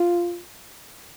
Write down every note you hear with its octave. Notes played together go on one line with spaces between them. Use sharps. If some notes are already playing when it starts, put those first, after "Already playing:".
Already playing: F4